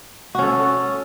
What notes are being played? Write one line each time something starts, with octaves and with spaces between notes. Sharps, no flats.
C#4 F#4 A4